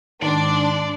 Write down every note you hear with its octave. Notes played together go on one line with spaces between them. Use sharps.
G#2 D#3 D4 D5 C6 D6